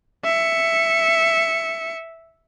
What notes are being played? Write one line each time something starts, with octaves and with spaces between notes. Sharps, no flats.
E5 C#7